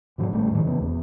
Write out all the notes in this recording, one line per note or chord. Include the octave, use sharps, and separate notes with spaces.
G#2 B2 D3 F#3
A1 D3 G3 A3
F2 A2 D#3
C#3 E3 B3
D#1 E2 G3 B3